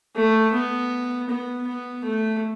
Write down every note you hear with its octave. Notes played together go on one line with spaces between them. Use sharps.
A3
B3
B3
B3
A3